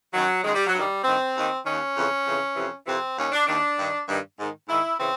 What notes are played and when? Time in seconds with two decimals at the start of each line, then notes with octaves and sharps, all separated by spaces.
0.13 F#2 D#3 F#3
0.44 F#2 D#3 G#3
0.55 G3
0.67 F#3
0.74 G2 D#3 G3
1.04 G2 D#3 C4
1.35 D#2 D#3
1.65 D#2 D#3 C#4
1.95 F2 C#3 E3
2.25 F2 C#3 E3
2.56 F2 C3 E3
2.86 F2 C3 E3 C4
3.16 D#2 D#3 C#4
3.32 D4
3.47 D#2 D#3 D4
3.77 G2 D#3
4.08 G2 D#3
4.37 G#2 D#3
4.68 G#2 D#3 E4
4.98 C#3 E3 C4